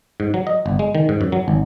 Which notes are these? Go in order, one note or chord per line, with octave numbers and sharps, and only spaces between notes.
G#2
F#3
D#5
G1
G#3
D#3
G#2
F#2
F#3
G#1